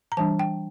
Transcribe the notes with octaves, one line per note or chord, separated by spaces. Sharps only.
A#5
E3 G3 D4 A5
G5